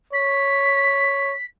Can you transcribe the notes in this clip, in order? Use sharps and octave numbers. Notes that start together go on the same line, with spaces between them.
C#5 B6